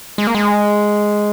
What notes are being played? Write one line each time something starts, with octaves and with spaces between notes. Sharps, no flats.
G#3
A#3
G#3